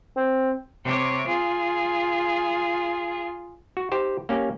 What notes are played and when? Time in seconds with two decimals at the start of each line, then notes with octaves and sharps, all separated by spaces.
0.16 C4
0.84 C3 C#5 D6
1.27 F4 G#4
3.77 F#4
3.92 D#4 G4 C5
4.29 A#3 C#4 G4